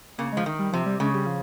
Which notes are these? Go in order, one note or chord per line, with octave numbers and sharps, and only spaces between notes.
C#3 A#3
G#3
F3
D#3
G3
C3 F3
G3
C#3 G#3
G3
F3